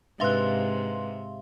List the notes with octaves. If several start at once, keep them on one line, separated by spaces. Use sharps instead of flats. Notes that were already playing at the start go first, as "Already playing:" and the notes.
G#2 C3 D4 B4 E5 F5 C6 F#6